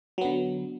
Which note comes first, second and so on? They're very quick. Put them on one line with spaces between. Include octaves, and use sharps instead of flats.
F#3 B3 D3